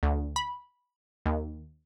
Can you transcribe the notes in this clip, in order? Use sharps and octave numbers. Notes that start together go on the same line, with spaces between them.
D2
B5
D#2